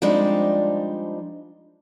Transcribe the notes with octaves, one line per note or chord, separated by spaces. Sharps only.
F3 G3 G#3 C4 D4 D#4